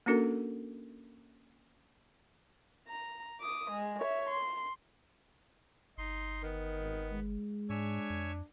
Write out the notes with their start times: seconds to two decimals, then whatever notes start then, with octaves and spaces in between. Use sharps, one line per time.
0.06 A#3 C#4 D4 F#4 A4 A#4
2.88 A#5
3.41 D6 D#6
3.71 G#3
4.00 C#5 E5
4.29 C6
5.98 G1 D#4 C6
6.43 D#3 B3
6.80 G#1
7.12 G#3
7.70 G#2 D4 C#5 E5 G#5
8.10 F2